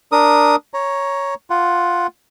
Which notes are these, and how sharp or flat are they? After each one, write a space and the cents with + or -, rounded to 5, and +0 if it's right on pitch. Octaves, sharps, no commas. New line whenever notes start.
D4 +0 A#4 +0 D#6 +0
C#5 +0 A#5 +10
F4 +5 F#5 +0